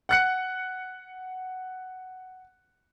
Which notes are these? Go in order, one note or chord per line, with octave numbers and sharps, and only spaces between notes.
F#5 F#6 C#7